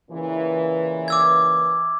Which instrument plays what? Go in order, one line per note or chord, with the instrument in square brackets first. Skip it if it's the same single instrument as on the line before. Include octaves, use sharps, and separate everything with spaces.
[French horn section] A#2 C#3 E3
[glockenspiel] D6 E6 G#6